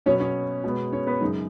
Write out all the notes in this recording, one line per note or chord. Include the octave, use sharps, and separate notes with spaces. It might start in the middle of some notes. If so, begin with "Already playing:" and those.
B2 F#3 B3 C#4 C#5
C#4 C#5
B2 G#3 B3
C#4 C#5
B3 B4
F#2 C#3 G#3 D#4